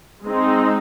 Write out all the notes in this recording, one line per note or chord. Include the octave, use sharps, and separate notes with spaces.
G#3 C4 D#4